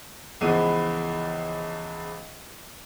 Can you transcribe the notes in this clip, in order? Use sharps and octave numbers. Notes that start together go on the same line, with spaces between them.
C#2 E3 F3 G#3 B3 D#7